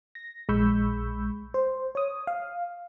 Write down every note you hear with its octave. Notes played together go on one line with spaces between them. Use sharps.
A#6
A#1 G#3 B5 C#6 E6 G6
C5
C#5 D#6
F5